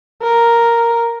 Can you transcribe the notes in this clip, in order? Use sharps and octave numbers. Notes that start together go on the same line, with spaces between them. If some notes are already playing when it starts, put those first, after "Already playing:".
A#4